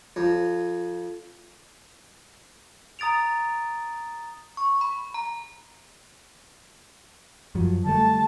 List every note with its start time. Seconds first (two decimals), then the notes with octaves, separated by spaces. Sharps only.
0.16 F2
2.99 A#5 D#6 A6 D7 F7
4.57 C#6
4.81 B5
5.14 A#5
7.55 F#2 F3 F#3
7.85 D3 G3 A3 A5